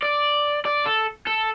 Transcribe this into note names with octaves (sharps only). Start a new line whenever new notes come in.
D5
D5
A4
A4